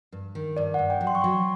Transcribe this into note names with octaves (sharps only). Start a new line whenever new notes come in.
G2
D#3
G2 D5
G2 F#5
G5
F#3
C6
C#6
F#3 C6